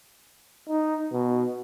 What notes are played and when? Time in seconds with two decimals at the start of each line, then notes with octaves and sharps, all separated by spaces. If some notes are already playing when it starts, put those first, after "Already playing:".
0.69 D#4
1.12 B2